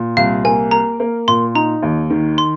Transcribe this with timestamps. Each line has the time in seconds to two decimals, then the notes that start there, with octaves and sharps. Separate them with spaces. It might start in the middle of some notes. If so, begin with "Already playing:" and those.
Already playing: A#2
0.17 C2 F5
0.44 A#3 G#5
0.71 A#4 A#5
1.00 A#3
1.28 A#2 C6
1.55 D#4 A#5
1.82 D#2
2.10 D#3
2.38 C6